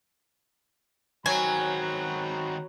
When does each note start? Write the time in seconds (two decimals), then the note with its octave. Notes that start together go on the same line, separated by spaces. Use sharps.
1.26 D#3 F#3 C4 F#4 G#5 A#5 B5